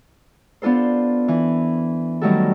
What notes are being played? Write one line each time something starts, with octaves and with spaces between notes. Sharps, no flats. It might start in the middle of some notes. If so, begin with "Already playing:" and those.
B3 D4 F4 A4 C5
E3
D#3 F#3 G3 A3 F#4 A4